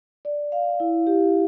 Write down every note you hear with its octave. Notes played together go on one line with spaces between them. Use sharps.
D5
F5
E4
G4